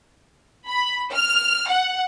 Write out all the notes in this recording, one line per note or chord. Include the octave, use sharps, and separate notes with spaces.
B5
F6
F#5